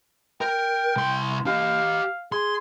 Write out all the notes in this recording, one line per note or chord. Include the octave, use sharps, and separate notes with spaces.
A#4 G5
C2 C6
G4 D#5 F5
G#4 C6